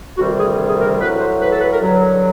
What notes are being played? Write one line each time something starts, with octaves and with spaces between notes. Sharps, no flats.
D2 C3 D#3 G3 F#4
G#4
G#4
A#4
A2 F#3 B4
C5
B4
A4
B4
A#4
G2 D3 F#3